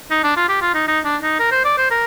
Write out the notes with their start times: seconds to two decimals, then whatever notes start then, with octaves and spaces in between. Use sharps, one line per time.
0.11 D#4
0.23 D4
0.36 F4
0.49 G4
0.61 F4
0.74 D#4
0.88 D#4
1.05 D4
1.22 D#4
1.39 A#4
1.51 C5
1.64 D5
1.78 C5
1.90 A#4